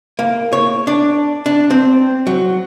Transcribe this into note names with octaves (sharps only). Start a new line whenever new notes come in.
A#3
C#5
D4
D4
C4
F#3